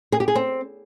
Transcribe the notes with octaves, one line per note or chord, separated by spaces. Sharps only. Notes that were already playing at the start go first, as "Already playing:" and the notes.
G#4
G4
G#4
C4